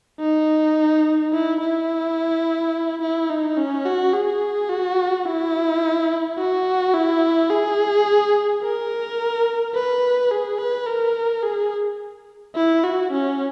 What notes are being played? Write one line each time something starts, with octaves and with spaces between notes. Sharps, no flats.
D#4
E4
E4
E4
D#4
C#4
F#4
G#4
F#4
E4
F#4
E4
G#4
A#4
B4
G#4
B4
A#4
G#4
E4
F#4
C#4